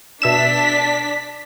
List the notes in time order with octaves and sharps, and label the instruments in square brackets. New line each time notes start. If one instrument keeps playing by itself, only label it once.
[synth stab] B2 E5 E7 [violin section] D4 B6